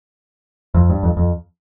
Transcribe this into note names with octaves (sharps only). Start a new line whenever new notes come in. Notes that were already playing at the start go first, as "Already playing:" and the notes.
F2
G2
F2
F2